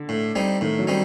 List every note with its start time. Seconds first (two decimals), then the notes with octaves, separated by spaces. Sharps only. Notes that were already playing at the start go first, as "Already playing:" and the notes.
Already playing: D3
0.09 A2
0.35 G3 C4 D#4
0.61 A2 D#3
0.79 F#3
0.87 G3 C4 D#4